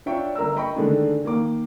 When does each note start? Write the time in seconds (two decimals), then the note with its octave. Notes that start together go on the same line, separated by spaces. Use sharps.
0.06 D4 F4 C#5 E5 G5 C#6
0.35 G1 A#4 A#5 E6
0.56 D#5 G5 B5 C#6
0.76 D3 D#3 G#3 A3 D4
1.25 D#3 A#3 D6